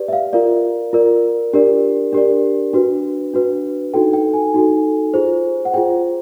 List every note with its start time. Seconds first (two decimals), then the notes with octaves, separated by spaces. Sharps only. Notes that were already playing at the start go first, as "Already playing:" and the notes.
Already playing: G4 B4 D5
0.08 E5
0.13 F5
0.33 F4 A#4 D5 F5
0.93 F4 A#4 D5
1.53 D4 G4 A#4 D5
2.13 D4 G4 A#4 D5
2.73 D4 F#4 B4
3.33 D4 F#4 B4
3.94 D#4 F#4 A4 G5
4.13 G5
4.34 G#5
4.54 D#4 F#4 A4
5.14 F4 G#4 C5
5.65 F#5
5.74 F4 G#4 C5 G5